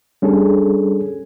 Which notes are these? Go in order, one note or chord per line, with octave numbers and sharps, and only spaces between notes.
G3 C#4 D4 G#4 A4